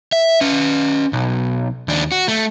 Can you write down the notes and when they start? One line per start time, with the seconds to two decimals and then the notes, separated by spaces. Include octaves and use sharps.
0.12 E5
0.41 C#4 B4
1.13 B1
1.88 D#2 D4
2.12 F#4
2.28 A3